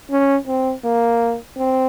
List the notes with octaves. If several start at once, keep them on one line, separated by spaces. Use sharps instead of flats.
C#4
C4
A#3
C4